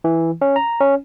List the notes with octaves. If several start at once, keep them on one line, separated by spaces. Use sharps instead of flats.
E3
C#4
A#5
C#4